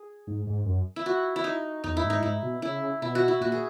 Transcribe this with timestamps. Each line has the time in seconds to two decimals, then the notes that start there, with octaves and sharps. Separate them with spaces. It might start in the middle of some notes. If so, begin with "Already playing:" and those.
Already playing: G#4
0.27 G#2
0.47 G#2
0.66 F#2
0.96 E4
1.06 F#4
1.36 E4
1.44 D#4
1.84 E2 D#4
1.97 E4
2.03 G#2
2.10 D#4
2.23 G#2 E4
2.43 B2
2.62 C#3 E4
3.02 B2 E4
3.15 F#4
3.28 E4
3.41 A#2 F#4
3.52 G#4